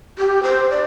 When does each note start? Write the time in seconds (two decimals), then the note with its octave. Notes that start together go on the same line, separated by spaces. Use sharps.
0.18 G4
0.43 C5
0.70 D5